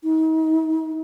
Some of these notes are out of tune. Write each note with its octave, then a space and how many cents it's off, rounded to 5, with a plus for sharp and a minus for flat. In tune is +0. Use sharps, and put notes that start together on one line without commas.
D#4 +40